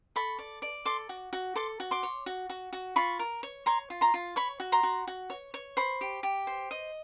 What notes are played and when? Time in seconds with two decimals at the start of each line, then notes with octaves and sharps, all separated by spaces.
0.16 A4 B5 C#6
0.39 D5
0.62 D5
0.85 A4 C6 D6
1.09 F#4
1.33 F#4
1.55 A4 C6 D6
1.80 F#4
1.91 C6 D6
2.03 C#5
2.26 F#4
2.50 F#4
2.73 F#4
2.96 F4 B5 C#6
3.19 A#4
3.43 C#5
3.66 C#5 A#5 C6
3.90 F4
4.01 A#5 C6
4.14 F4
4.36 C#5 B5 C#6
4.60 F#4
4.72 A#5 C6
4.83 F#4
5.07 F#4
5.30 C#5
5.54 C#5
5.77 C5 B5 C#6
6.01 G4
6.23 G4
6.47 C5
6.71 D#5